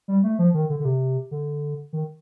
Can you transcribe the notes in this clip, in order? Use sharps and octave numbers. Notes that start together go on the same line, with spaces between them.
G3
A3
F3
D#3
D3
D3
C3
D3
D#3